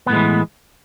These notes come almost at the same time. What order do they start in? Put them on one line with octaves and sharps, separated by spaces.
B3 A2 G#3 E3